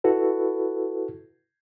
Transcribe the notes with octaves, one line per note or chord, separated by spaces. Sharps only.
E4 F#4 A4 B4